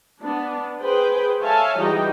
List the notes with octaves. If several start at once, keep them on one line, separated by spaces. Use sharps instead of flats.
B3 D4
G#4 B4 C5 G5
A4 C#5 E5 F5 G#5 A5
E3 G3 D#4 F#4 G#4 G5